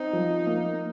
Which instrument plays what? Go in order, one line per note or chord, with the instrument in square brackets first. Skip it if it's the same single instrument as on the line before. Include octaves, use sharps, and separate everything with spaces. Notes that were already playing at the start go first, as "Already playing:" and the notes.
Already playing: [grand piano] C4 [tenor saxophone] D#4
[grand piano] F3
A#3